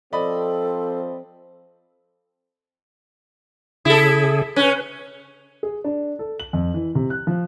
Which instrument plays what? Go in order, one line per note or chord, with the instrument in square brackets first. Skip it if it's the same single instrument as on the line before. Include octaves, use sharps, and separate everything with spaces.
[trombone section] F3 C4 [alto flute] A4 [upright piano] D5 D#5 B5
[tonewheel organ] C#3 G#4 [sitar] E4 A4
[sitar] C#4 [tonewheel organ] B4
[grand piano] G#4
D4
A4
F#7
F2
E3
C3
F#6
F3